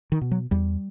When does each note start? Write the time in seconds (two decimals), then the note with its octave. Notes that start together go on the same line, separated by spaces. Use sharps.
0.12 D#3
0.21 B2
0.31 F#3
0.51 E2 G3